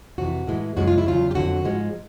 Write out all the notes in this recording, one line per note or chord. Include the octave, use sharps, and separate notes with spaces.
F2 C3 E3 F#4
A2 E3 G#3
F#2 C#3 F3 G#3 F#4
F4
E4
E2 C#3 F#3 F4
G4
F2 D3 F#3 F#4
G#2 F3 G#3